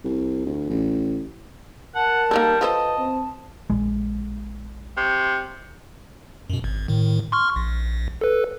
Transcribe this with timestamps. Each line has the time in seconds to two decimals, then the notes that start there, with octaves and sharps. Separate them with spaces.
0.04 C2
0.45 D2
0.69 A1
1.95 A#4 F#5 A5
2.31 G3 A#3 D#4 A4
2.61 F3 A4 B4 C5 D#5
2.98 C4
3.70 A#1 G#3
4.97 C3
6.50 F#2 B2
6.64 G#1
6.88 A2 D#3
7.32 C6 C#6 F6
7.56 A#1
8.21 A4 B4